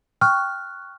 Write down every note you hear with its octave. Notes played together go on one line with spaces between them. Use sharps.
G5 C#6 F6 F#6